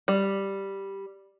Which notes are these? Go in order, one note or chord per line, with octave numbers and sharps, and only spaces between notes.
G3